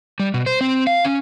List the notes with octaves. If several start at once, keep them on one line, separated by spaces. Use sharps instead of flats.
G3
B2
C5
C4
F5
C#4